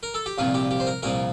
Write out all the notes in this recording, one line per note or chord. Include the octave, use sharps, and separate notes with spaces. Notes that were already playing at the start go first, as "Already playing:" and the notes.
A#4
A4
G4
C2 A#2 F3 F4
G4
G4
C5
A#4
C2 A#2 F3 A#4